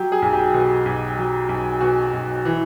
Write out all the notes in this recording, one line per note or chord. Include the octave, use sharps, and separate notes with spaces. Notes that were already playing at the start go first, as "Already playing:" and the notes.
Already playing: F#3 G4
G#4
B1
G4
B2
B1
F#3
B1
B2 F#4
B1
E3